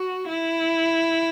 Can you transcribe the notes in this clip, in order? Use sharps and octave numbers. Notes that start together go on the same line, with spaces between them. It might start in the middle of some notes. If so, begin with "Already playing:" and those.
Already playing: F#4
E4